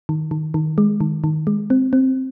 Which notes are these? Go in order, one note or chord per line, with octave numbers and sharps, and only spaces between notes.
D#3
D#3
D#3
G#3
D#3
D#3
G#3
C4
C4